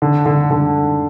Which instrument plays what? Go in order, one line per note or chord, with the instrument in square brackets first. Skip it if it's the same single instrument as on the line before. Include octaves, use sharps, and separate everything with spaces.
[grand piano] D3
D3
D3